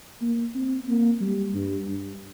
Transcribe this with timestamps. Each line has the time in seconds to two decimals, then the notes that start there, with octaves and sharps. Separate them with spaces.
0.22 A#3
0.55 C4
0.88 A#3
1.21 G3
1.54 G2
1.87 G2